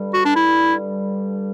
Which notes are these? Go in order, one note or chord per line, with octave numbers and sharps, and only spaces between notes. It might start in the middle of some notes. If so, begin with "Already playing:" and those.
Already playing: G2 D3 G3
F#4
D4
E4